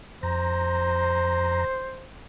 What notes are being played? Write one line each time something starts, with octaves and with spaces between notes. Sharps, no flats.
F2 C5 A#5